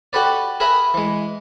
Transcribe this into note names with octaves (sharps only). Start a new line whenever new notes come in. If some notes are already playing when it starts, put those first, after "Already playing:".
F#4 G4 A4 B4 D5
G#4 A#4 B4 E5 B5
E3 G#3